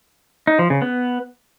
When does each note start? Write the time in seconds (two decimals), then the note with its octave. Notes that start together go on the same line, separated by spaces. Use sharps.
0.47 D#4
0.59 F3
0.70 C#3
0.82 B3